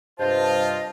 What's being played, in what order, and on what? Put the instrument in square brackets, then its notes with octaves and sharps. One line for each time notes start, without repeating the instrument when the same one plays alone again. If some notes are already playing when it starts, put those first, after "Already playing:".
[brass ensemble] G2 C3 F4 [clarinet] C5 [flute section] D#5 A5